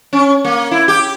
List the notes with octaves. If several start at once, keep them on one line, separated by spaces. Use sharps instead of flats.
C#4
A#3
E4
G4